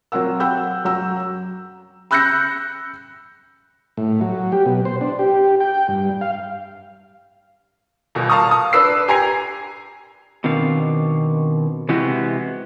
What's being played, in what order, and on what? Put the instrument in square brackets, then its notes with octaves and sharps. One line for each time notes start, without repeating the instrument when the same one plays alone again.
[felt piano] F#3 C4 A#4 F#5 E6
F#5 G5 B5 E6 G6
F#2 F#3 F#5 A#5 E6
B5 E6 F#6 G6 A#6 C#7
[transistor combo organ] A2
F#3
G4
B2
C5
D4
G4
G5
G2
F5
[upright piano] D#1 B2
F5 A5 A#5 C#6 D#6
A5 D#6
D4 B4 E6 C7
G4 G#5 A#5 G#6 C7
[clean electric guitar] B2 D#3 C4 D4 F5
C3 E3 G#3 B3 F#4 G4